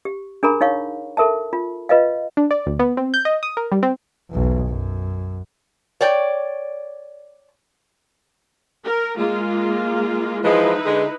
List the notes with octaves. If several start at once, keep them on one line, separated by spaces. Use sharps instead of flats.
G4
D4 G#4 A#4 A#5 B5
D#4 C#5 F5 C#6
A4 A#4 E5 A5
F4
F4 B4 D#5 F5
D4
D5
D2
B3
C4
G6
D#5
D#6
A#4
G3
C4
B1 E2
F#2
C#5 D5 G5
A#4
G#3 A#3 F4
E3 F3 G#3 D#4 E4 B4
D3 G#3